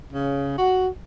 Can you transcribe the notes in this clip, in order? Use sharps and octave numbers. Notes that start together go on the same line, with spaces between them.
C#3
F#4